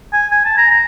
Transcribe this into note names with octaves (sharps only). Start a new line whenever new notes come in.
G#5
G#5
A5
A#5
A#5